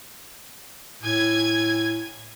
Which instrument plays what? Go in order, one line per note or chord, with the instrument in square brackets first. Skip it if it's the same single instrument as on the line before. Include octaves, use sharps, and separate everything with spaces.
[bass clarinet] A2 [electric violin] G#5 G#6